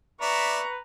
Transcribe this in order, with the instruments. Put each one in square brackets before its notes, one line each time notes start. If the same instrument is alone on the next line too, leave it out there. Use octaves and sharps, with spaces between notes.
[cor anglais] B4 [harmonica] D5 E5 [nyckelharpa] A#5 [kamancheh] C#6